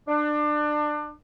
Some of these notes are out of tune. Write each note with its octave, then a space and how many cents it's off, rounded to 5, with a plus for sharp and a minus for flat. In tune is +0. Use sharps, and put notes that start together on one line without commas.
D4 +25